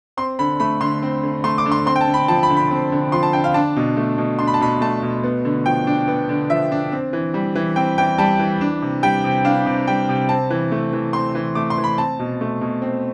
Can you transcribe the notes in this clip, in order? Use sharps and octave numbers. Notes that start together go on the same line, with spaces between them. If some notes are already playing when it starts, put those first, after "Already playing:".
C4 C6
D3 B5
A3 B5
D3 C6
C4
D3
A3 C6
D6
D3
C6
C4 C6
G5
A5
D3
B5
F3 A5
B5
D3
B5
C4
D3
F3 C6
A5
D3 G5
F5
D4 A5
B2
A3
B2
D4 C6
B5
A5
B2 B5
A3 A5
B2
B3
D3
F3 G5
D4
B3
D3
F3 E5
D4
C4
E3
G3
E3
C4 G5
E3 G5
G3 A5
E3
D4
C3
G3 G5
C3
D4 F5
C3
G3 G5
C3
C4 A5
E3
A3
E3
C4 C6
E3
A3 D6
C6
E3
B5
C4 A5
B2
A3
B2
C4